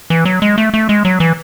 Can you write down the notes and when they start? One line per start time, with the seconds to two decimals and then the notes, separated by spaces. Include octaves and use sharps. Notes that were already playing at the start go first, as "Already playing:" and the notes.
0.10 E3
0.25 F#3
0.42 G#3
0.58 A3
0.74 A3
0.89 G#3
1.05 F#3
1.20 E3